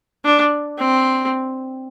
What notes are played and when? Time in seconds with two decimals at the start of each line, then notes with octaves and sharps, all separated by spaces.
0.25 D4
0.79 C4